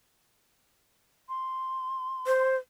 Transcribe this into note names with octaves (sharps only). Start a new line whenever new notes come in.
C6
C5